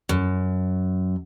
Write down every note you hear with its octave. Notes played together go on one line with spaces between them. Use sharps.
F#2